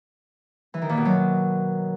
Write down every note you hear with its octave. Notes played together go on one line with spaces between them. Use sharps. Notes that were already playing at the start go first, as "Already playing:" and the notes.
E3
D#3
A#2
B2
F#3